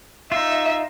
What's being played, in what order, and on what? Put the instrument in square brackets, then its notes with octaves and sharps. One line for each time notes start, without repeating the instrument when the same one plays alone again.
[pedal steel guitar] D#4 F4 [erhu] E5